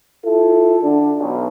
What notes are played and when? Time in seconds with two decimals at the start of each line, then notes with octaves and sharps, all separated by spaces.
0.24 E4 F4 A4
0.83 D3 D4
1.19 B1